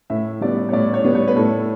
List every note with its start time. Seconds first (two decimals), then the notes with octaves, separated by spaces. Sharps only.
0.10 A2 E5
0.41 G3 B3 D5
0.69 C#5
0.73 A2 D5
0.94 C#5
1.04 G3 B3
1.15 C#5
1.28 B4
1.36 A2 A4